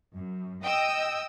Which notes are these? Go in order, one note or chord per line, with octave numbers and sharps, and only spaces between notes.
F#2
D#5 G5 D#6 E6